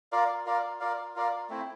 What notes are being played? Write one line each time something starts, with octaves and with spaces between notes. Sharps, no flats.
F4 A#4 D5 F5
F4 A#4 D5 F5
F4 A#4 D5 F5
F4 A#4 D5 F5
A3 C4 E4